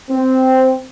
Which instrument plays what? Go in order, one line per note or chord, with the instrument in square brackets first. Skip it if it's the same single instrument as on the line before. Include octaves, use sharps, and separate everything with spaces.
[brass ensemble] C4